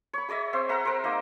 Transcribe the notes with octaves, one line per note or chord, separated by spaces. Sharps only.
C#5 B5
G#4 C#5 D#5 E5
C4 C5 E5
B4 E5 F#5 A#5
A#4 C5
A#3 D#4 D#5